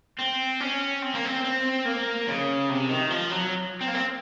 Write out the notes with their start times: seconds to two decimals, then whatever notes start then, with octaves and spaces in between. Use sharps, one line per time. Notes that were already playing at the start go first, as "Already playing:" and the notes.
0.19 C4
0.60 C#4
1.02 C4
1.14 A#3
1.25 C4
1.44 C4
1.85 A#3
2.27 C#3
2.69 C3
2.90 D#3
3.10 F3
3.31 F#3
3.81 C4
3.88 A#3
3.95 C4